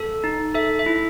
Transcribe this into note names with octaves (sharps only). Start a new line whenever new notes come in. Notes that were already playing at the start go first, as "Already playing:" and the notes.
Already playing: A4
D#4
A4 E5
E5
E4